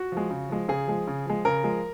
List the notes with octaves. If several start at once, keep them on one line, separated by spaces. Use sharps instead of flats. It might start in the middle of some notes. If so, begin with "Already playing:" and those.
Already playing: F#4
F3 G#3
C#3
F3 G#3
C#3 G#4
F3 G#3
C#3
F3 G#3
C#3 A#4
F3 G#3